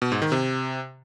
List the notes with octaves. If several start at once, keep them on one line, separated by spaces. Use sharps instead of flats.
B2
G#2
D#3
C3